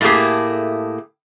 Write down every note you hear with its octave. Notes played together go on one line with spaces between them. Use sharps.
A2 A3 A#3 G4 G#4